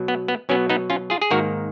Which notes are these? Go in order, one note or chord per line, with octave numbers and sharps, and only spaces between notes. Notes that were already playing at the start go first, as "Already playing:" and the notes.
Already playing: B2 F#3
B3
B3
B2 F#3 B3 C#4
B3 D#4
C#4 F4
F4 G#4
G#4
G#2 D#3 A#3 F#4 A#4